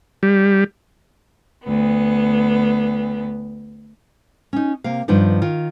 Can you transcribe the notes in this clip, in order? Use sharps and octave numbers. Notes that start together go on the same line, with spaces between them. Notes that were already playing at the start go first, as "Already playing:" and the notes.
G3
D2 B3
C#4 D#4
C3 A#3 F5
G2 D#3 F3 B3 D4 D#4
D#3 F4